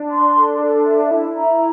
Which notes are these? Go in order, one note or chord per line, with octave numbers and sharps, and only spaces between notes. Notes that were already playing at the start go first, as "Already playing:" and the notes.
Already playing: D4
C6
A4
A4
E5
E4 E5
A#5